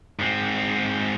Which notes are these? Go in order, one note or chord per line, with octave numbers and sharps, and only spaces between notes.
G#2 C4